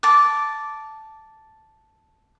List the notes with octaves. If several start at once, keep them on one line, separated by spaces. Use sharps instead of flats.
A5 D6